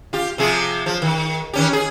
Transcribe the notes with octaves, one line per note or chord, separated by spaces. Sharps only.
F4 G4
C3 F3 G#4
F3
D#3
D#3 C#4 G4
G#4